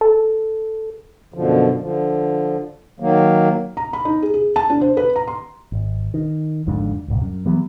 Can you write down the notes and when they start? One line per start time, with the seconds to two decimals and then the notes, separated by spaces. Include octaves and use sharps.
0.01 A4
1.34 F#2 B2 D3 F3
1.80 D3 F3
3.00 D#3 F#3 A#3
3.77 A#5
3.93 B5
4.05 D#4
4.22 G#4
4.34 G#4
4.56 A5
4.70 D4
4.81 C5
4.97 B4
5.16 A#5
5.28 C6
5.72 G#1
6.14 D#3
6.67 G#1 F2 G#2 D3
7.08 D1 G1 C2
7.22 F#2
7.46 E3 F#3 G3 B3